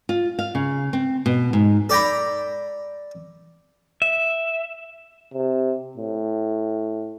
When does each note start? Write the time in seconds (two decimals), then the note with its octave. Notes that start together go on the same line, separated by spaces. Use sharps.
0.09 F4
0.39 F5
0.55 C#3
0.93 C4
1.26 B2
1.53 G#2
1.90 A4 D5 G5 A#5 B5
4.02 E5
5.34 C3
5.97 A2